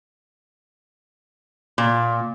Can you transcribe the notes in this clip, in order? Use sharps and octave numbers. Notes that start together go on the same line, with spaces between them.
A#2